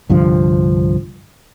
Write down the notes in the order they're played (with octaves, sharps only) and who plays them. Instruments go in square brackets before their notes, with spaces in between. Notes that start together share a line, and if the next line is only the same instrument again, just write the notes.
[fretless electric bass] C2 G2 D3 F3